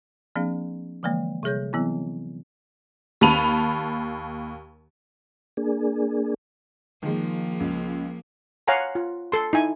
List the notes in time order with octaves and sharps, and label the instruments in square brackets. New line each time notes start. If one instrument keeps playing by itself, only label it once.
[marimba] F3 A#3 C4 D4 G#4 F5
D3 E3 F3 G#3 A#3
C3 G3 G#4 C#5 G6
E3 F#3 B3 C4 E4
[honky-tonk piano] D#2 A5 B5 D#7 F7
[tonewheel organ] A#3 D4 G#4
[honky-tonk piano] D#3 G#3 [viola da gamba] F3 A#3
[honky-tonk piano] C#2
[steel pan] C#5 F5 F#5 G#5 A#5 C6
F4
A4 C6
D#4 E4 G#5